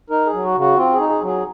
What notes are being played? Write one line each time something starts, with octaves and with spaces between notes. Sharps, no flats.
D#4 A#4
G#4
F#3
F#4
C#3
F#4
C4 F4
G#4
D#4
G#4
F#3 G#4